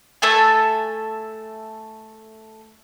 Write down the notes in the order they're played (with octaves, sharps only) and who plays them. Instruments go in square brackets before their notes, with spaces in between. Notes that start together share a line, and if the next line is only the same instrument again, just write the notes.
[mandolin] A3 A4 E5 G#5